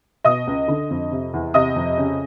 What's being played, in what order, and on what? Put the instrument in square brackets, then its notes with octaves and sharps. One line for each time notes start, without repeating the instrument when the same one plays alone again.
[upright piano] B2 D#5 D#6
C#2
D3
F2
C3
E2
C3 D#5 D#6
F2
C#3